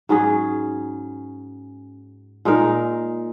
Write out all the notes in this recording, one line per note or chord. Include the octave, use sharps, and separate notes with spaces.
G#2 F#3 C#4 G#4
A#2 G#3 D#4 A#4